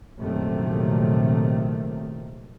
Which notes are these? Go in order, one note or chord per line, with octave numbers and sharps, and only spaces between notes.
A#1 F#2 C3 D#3 A3